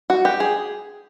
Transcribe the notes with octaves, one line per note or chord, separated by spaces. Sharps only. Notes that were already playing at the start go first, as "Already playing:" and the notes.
F#4
G4
G#4